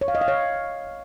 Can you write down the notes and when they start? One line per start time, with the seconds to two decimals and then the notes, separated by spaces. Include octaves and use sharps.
0.01 C#5
0.08 F5
0.15 D#5
0.21 F5
0.28 C#5